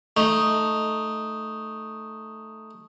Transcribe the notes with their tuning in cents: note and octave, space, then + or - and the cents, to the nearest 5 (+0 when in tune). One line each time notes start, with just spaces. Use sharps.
A3 +0 D#4 +0